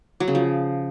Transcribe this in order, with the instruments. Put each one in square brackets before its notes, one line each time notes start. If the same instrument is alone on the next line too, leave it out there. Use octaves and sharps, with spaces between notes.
[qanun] F#3
C#3
F3